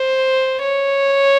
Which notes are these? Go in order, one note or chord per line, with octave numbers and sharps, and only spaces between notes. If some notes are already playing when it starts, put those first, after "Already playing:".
Already playing: C5
C#5